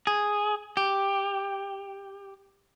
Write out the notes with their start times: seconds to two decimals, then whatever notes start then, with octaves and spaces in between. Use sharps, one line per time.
0.07 G#4
0.77 G4